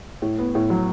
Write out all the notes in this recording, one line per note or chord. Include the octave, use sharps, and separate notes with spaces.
A2
B3
A2
F#3